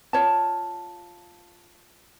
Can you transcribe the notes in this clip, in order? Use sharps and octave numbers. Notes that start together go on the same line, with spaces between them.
F4 C#5 A5